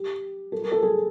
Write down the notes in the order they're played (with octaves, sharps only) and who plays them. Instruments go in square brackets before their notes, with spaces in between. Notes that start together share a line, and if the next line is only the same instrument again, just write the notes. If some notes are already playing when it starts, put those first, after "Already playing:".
Already playing: [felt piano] G4
A4
A#4
A4
G#4